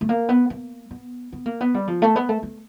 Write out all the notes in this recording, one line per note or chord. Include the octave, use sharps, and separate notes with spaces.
A3
A#3
B3
A#3
B3
B3
A#3
B3
G3
F3
A3
B3
A3
A3